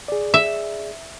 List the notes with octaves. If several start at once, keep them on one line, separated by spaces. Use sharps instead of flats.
G#4 D5
E5